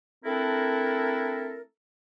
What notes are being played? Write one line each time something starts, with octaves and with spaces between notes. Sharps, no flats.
A3 C4 D4 E4 A4 A#4